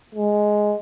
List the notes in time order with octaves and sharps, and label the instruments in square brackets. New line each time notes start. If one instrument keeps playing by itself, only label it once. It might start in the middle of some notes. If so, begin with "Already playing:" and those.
[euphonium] G#3